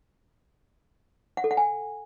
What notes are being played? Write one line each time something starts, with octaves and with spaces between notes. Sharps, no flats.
F#5
A4
F#5
G#5